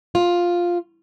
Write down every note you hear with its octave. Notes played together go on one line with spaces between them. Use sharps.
F4